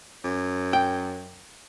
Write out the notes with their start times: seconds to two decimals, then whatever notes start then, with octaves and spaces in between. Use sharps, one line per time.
0.24 F#2
0.73 G5